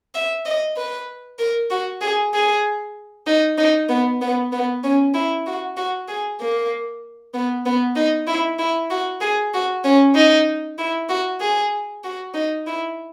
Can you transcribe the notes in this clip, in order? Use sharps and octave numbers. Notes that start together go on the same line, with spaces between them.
E5
D#5
B4
A#4
F#4
G#4
G#4
D#4
D#4
B3
B3
B3
C#4
E4
F#4
F#4
G#4
A#3
B3
B3
D#4
E4
E4
F#4
G#4
F#4
C#4
D#4
E4
F#4
G#4
F#4
D#4
E4